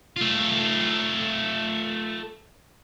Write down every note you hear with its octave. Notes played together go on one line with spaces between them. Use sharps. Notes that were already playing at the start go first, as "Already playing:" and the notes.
A3 F4